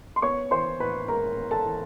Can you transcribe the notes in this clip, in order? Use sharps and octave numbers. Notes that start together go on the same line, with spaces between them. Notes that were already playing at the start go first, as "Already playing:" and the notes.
C6
B3 C#5 C#6
E3 C5 C6
A2 B4 B5
G#3 A#4 A#5
B3
A4 A5
E3